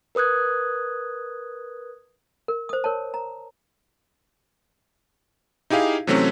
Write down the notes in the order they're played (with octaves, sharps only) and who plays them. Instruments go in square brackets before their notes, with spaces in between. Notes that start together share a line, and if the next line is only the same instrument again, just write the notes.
[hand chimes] A#4 B4 D#6 F#6 G#6
[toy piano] A#4
C5 D#6
A#4 C#5 A5
A#5
[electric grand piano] D#4 E4 G4 G#4 F5
C3 E3 F#3 A3 C4 C#4